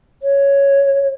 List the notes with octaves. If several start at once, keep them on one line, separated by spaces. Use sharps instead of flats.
C#5